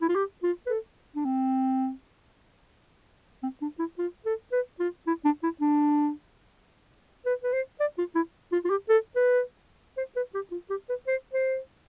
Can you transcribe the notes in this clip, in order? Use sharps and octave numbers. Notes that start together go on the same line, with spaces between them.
E4
F4
G4
F4
B4
A4
D4
C4
C4
D4
E4
F4
A4
B4
F4
E4
D4
E4
D4
B4
B4
C5
D5
F4
E4
F4
F4
G4
A4
B4
C5
B4
G4
F4
G4
B4
C5
C5